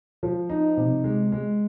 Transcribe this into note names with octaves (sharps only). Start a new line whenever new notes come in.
F3
D#4
C3
G#3
G#3